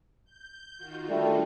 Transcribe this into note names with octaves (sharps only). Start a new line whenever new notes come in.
G6
D#3 F4 F#4
G3 A3 D4